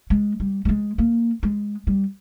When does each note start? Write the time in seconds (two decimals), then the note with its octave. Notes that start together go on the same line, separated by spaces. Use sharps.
0.10 G#3
0.40 G3
0.65 G3
0.69 G#3
0.98 A#3
1.43 G#3
1.87 G3